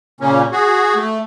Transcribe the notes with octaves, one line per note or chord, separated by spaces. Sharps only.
A#2 C#3 A#3 C#4
F#4 G#4
A3